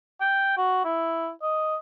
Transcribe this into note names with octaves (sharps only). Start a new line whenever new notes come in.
G5
F#4
E4
D#5